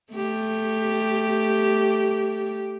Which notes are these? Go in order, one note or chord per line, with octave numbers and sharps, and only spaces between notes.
A3 G4